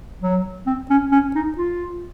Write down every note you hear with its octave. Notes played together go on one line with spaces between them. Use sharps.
F#3
C4
C#4
C#4
D#4
F4